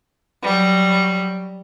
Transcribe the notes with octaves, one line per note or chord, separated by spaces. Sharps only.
F#3 G3